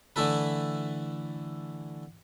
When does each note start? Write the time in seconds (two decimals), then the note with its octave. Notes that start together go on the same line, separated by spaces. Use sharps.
0.16 D3 E3 A3 E4 A4 B4